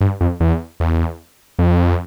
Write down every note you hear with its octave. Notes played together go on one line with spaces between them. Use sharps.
G2
F2
E2
E2
F2